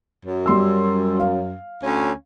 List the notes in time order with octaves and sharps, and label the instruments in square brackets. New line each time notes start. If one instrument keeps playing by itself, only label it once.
[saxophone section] F#2
[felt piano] G3 C6 E6
F5
[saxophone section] D2 C#4